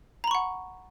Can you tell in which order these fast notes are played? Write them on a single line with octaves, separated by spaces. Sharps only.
A#5 B5 C#6 F#5